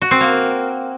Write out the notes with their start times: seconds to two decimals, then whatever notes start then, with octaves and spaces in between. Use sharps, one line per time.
0.02 F#4
0.11 C4
0.21 A#3